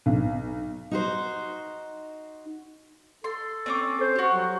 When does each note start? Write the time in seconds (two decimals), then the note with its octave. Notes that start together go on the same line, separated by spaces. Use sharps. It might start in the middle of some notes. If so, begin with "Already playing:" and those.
0.06 B1
0.91 D#4 F#4 C5
3.24 A4 C6
3.66 C4 C#4 D6
4.01 C5
4.15 F#4 G4
4.32 F#3